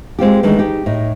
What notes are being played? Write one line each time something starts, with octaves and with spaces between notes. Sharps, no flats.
G#3 C4 F4 G4
D#3 E3 G#3 A3 D4
D#4 G4
A2 D#4